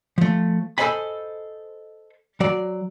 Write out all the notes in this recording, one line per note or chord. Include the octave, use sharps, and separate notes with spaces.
F3 A3
A4 A#4 C5 D#5 G#5 B5
F#3 D5